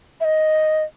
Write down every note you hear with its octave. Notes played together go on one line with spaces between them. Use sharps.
E5
D#5